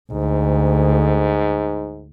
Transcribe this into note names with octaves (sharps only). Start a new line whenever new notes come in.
D2 G#2